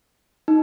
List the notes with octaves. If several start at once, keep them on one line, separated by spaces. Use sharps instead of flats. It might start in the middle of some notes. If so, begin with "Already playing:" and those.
D#4